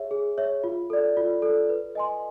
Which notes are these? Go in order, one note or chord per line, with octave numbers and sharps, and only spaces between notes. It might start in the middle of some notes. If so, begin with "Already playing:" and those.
Already playing: G#4 C#5 E5
G#4
C#5 E5
F4
A4 D5
F4
A4 D5
B4
D#5 G#5 C6